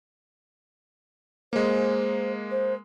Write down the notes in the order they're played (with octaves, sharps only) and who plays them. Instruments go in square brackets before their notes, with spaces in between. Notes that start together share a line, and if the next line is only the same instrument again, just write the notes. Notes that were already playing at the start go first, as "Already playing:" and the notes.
[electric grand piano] G#3 A#3 [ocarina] C5
[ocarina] C5